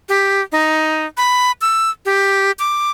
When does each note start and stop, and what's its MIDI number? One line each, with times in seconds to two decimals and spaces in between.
0.09 0.42 67
0.52 1.06 63
1.17 1.52 83
1.62 1.90 88
2.06 2.51 67
2.59 2.91 86